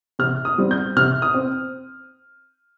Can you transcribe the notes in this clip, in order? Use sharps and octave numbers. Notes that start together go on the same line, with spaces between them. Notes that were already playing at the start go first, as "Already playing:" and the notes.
C3 F6
D#6
G3 C4
G6
C3 F6
D#6
C4